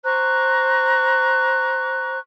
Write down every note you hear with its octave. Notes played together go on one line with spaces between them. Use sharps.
C5 A#5 C#6 F#6